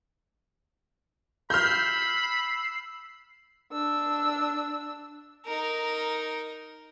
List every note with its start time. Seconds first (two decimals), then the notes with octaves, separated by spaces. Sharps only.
1.50 B5 E6 F6 G6 C7
3.72 D4 E6
5.45 D#4 A#4